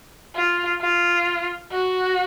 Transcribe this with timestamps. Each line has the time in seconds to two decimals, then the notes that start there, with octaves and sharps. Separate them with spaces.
0.36 F4
0.81 F4
1.72 F#4